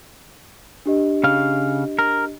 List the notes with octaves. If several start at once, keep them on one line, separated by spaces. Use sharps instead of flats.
D4 G4 D#5
C#3 F5
A#4